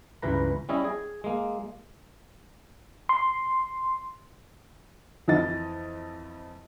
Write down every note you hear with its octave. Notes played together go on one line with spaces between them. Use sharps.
C#2 G2 E3 B4 A#5
G3 C#4 E4 D#5
G#4
G#3 A#3
C6
F2 E3 D#5 A6